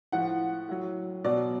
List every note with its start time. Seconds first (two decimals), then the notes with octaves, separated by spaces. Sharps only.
0.12 A2 F3 F#5
0.69 A2 F#3
1.24 B2 F#3 D5